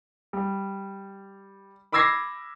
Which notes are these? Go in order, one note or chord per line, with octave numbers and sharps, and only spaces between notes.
G3
B5 D6 E6 G#6 A#6 C7